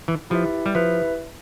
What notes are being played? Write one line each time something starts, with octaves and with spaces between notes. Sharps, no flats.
E3
F3 E4 G4 B4 E5
G3
F3 E4 G4 B4 E5